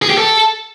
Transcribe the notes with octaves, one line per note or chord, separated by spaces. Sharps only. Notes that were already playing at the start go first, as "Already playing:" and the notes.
G#4
G4
A4